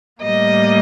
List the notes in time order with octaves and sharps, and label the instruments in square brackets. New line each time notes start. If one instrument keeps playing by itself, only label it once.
[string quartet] A2 G3 A#3 D#5